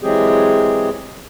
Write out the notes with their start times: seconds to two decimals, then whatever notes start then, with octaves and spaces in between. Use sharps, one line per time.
0.02 E3 F#3 G#3 C4 G4 G#4